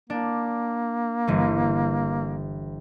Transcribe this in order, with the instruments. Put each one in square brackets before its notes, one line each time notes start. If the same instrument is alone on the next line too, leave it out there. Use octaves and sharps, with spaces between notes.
[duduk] A#3 [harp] D4
[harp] G1 E3